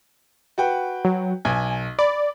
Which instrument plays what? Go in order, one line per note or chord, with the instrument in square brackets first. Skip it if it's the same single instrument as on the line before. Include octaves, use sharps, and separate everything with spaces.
[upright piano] F#4 B4 G5
[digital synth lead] F#3
[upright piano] B1 [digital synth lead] G#5
[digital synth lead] D5 [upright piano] B5